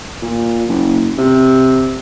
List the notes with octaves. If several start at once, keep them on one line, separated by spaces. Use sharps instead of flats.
A#2
F#1
C3